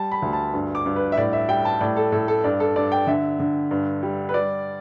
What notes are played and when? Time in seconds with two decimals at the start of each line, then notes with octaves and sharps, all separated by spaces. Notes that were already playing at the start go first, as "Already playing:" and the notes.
Already playing: G3 A5
0.12 B5
0.22 D2
0.33 A5
0.54 G2
0.75 D6
0.86 G2
0.96 B4
1.12 E5
1.17 A2 D5
1.33 E5
1.49 G3 G5
1.65 A5
1.81 A2 D5
1.97 A4
2.12 A2 A4
2.28 A4
2.44 G2 D5
2.60 A4
2.76 G2 D5
2.92 G5
3.07 D3 E5
3.40 D3
3.71 G2
4.03 G3
4.29 B4
4.34 G3 D5